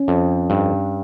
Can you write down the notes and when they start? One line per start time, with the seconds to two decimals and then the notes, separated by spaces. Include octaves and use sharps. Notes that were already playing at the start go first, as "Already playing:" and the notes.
Already playing: C#4
0.08 F2
0.50 G2